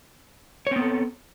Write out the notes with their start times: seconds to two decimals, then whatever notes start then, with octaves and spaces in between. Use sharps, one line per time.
0.67 C#5
0.71 C4
0.76 B3
0.81 A4